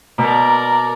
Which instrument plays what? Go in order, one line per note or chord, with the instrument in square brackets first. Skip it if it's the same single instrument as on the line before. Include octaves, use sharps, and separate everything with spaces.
[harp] B2 [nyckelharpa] A#4 D5 [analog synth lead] A#5